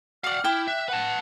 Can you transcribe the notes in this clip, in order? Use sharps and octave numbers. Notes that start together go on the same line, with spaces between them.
F#4 D5 F5 F#5 F6
E4 G5 D6
E5 F#6
B4 F#5 A5